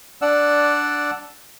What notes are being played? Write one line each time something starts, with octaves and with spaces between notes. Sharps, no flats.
D4 D5 F#5 E6